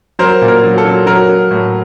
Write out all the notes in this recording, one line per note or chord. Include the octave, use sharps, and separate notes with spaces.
F#3 A#4 C5
A#2
A#4
F#3
A4
F#3
F#3 A#4
F#3
A2